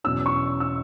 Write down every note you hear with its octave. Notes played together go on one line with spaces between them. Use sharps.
E2 B2 F#3 C#4 E6
C#6
E6